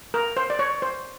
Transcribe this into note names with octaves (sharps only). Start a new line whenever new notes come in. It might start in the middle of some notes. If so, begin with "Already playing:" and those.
A#4
C5
D5
C#5
C5